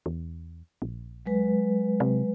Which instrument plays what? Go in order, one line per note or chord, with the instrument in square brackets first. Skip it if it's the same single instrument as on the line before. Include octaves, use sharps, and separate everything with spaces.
[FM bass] E2
A#1
[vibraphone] F#3 G#3 B4
[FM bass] C3